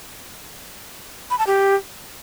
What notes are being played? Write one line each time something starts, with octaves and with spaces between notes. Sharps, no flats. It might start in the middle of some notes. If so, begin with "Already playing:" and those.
B5
A5
G4